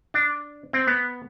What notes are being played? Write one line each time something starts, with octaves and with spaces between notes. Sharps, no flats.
D4
C4
B3